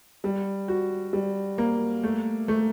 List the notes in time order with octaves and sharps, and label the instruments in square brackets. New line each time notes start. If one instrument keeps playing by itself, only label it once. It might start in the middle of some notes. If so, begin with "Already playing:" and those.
[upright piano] G3
F#4
G3
A#3
A3
A3